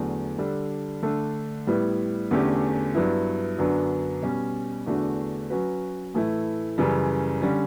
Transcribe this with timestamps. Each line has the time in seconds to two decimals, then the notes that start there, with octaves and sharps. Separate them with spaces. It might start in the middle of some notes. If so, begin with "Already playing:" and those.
Already playing: E2 D3 F#3 A3
0.38 D3 G3 D4 A4
1.02 D3 A3 D4 A4
1.67 A2 G3 B3 E4 B4
2.31 E2 D3 A3 C#4 G4
2.95 G2 F#3 B3 E4
3.58 F#2 D3 F#3 B3 D4
4.22 B2 G3 C#4
4.86 E2 D3 A3 D4 F#4
5.50 F#3 C#4 F#4 B4
6.14 A2 E3 A3 E4
6.78 F#2 C#3 E3 G3
7.42 D3 G3 C#4